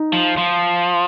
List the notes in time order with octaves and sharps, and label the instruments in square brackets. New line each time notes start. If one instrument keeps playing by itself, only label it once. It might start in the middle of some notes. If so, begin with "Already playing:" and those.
Already playing: [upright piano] D#4
[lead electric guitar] F3
F3